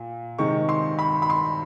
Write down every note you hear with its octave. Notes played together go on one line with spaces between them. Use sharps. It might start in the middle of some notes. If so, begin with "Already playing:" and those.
Already playing: A#2
C3 D#3 G#3 C#6
C6
B5
B5
C6